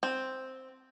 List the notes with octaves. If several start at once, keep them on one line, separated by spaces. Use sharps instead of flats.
C4